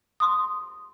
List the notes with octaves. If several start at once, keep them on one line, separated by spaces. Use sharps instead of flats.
C6 D#6